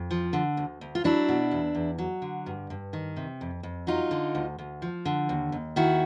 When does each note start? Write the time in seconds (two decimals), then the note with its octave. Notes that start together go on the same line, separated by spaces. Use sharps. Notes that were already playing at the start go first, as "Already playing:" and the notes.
Already playing: F2
0.11 F3
0.33 D3
0.57 D2
0.81 D2
0.95 F4
1.04 F#3 D4 E4
1.29 B2
1.51 E2
1.75 E2
1.98 F#3
2.22 D3
2.46 G2
2.70 G2
2.93 D#3
3.17 C3
3.41 F2
3.63 F2
3.87 F#3 D#4 F4
4.11 D3
4.35 D2
4.59 D2
4.82 F3
5.05 D3
5.29 D#2
5.52 D#2
5.76 D#3 E4 F#4